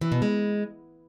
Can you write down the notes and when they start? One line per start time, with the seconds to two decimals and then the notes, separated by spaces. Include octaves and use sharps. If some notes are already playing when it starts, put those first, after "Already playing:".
0.01 E3
0.12 B2
0.22 G#3